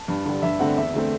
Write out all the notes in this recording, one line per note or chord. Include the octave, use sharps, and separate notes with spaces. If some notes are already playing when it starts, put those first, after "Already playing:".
Already playing: A5
G2
D3 G3
G2 E5
D3 A3 C4 F#5
E2 E5
D3 A3 C4